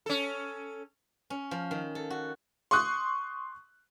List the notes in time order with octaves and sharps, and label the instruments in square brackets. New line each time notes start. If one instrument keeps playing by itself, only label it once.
[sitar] C#4 A4
[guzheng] C#4
F3
D#3
A4
F#4
[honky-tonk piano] C6 C#6 D#6 F#6